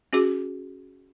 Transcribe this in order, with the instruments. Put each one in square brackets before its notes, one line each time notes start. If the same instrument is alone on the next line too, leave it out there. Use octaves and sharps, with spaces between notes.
[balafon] C#4 F#4 G#4 D6